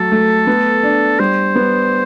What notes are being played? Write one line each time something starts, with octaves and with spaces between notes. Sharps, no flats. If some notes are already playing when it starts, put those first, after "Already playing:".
Already playing: F#3 A3 A4
A3
B3
D4
G3 C5
B3